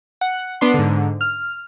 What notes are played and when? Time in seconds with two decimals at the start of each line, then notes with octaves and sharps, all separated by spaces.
0.21 F#5
0.61 B3 D4 C6
0.74 G#2 D3
1.21 F6